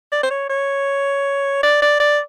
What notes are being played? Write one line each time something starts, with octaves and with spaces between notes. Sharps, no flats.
D5
C5
C#5
C#5
D5
D5
D5